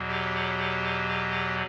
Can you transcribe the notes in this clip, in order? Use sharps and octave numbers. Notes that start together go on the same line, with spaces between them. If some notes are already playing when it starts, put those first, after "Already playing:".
Already playing: E2 B2 F#3
G4